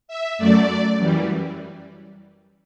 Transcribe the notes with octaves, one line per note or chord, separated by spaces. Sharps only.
E5
F#2 F#3 A3 D5
F#2 E3 G3